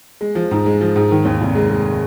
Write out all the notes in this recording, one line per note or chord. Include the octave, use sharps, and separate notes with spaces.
G#3
F3
G#2
G#3
F3
G#2
D#3
D#2
F1
G#3
G#3